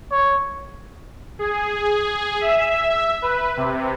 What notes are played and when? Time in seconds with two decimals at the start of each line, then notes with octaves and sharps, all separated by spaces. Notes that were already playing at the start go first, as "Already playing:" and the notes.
0.12 C#5
1.39 G#4
2.41 E5
3.22 B4
3.57 C3